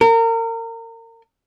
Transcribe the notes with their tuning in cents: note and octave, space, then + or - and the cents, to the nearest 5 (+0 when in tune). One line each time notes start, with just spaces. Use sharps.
A#4 -30